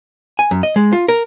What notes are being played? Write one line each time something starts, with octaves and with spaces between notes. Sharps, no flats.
G#5
F#2
D#5
G#3
F4
A#4